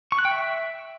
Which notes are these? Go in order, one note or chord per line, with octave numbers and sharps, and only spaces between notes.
C#6
F#6
G5
E5